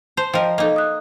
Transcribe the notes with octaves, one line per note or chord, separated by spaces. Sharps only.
C5 A5
F3 A#4 D#5 G5
A#3 D#4 A4 D#5
D#6 F#6